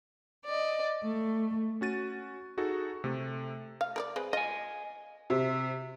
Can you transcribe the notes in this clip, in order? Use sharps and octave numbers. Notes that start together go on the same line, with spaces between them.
D5 D#5
A3
C#4 F#4 A6 D#7
D#4 F#4 G#4 A4
C3 A3 A4
F5
A#4 B4 D5
G#3 C4 B4
F4 D#5 G#5
C3